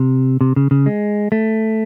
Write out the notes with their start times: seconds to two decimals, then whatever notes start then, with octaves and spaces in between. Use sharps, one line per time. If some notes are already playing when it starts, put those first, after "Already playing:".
Already playing: C3
0.41 C3
0.56 C#3
0.71 C#3
0.86 G#3
1.32 A3